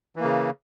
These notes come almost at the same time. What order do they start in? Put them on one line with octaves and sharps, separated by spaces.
E3 A#3 C#3